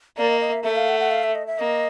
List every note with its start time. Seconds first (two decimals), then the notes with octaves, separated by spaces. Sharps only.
0.18 A#3 D5
0.29 D#5
0.41 D#5
0.52 E5
0.64 A3 E5
0.76 F5
0.88 F#5
1.00 F#5
1.11 F5
1.24 E5
1.35 D#5
1.47 E5
1.59 A#3 D#5